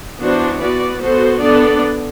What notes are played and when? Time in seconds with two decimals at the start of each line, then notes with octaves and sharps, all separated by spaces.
0.20 E3 B3 D4 F#4 C5
0.60 B3 F#4 B4 D5
1.01 B3 F#4 A4 C5
1.40 B3 D4 A4 D5